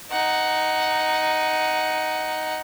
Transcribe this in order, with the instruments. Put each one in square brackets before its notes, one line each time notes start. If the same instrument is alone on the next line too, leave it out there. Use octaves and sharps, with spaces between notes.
[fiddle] D#4 F#5